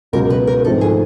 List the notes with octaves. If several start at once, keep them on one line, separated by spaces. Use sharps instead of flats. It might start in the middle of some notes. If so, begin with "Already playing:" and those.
C#2 B2 F#3 A#4
B4
A#4
G#1 G#2 F3 A3 C4 A4
G#4